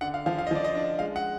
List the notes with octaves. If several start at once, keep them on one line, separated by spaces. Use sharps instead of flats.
D3 F#5
F5
F3 F5
F5
D#5
F3 D5
D#5
D4
G#3 F5
F#5